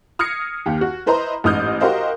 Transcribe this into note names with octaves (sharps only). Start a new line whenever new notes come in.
D#6 F6 G#6 A#6 C7 C#7
D#2 G4
F#4
E4 B4 C5 D#5 A#5 C6
A1 G#2 D#5 D#6 F6 G6
F#4 G4 A#4 C5 D#5 F5